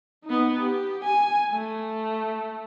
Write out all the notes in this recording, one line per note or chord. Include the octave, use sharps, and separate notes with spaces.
B3 D#4
G4
G#5
A3